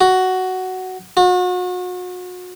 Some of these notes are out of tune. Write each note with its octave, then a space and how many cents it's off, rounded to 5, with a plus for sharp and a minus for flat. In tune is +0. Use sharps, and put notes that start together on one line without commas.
F#4 +10
F#4 -35